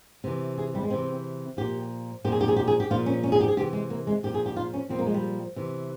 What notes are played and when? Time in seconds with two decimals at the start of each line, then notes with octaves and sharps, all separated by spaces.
0.24 C3 E3
0.58 G#4
0.75 G3
0.83 G#3
0.90 C3 E3 C4
1.57 A#2 F3 G4
2.24 A#2 F3 G4
2.32 G#4
2.41 G4
2.48 G#4
2.56 G4
2.67 G#4
2.80 G4
2.90 A#2 F3 F4
3.06 C#4
3.23 C#4
3.32 G#4
3.41 G4
3.48 G#4
3.57 C3 G4
3.61 E3
3.73 G#3
3.90 A#3
4.07 G#3
4.23 A#2 F3 G4
4.34 G#4
4.46 G4
4.56 F4
4.74 C#4
4.89 A#2 F3 C4
4.99 A#3
5.06 G#3
5.14 G3
5.56 C3 E3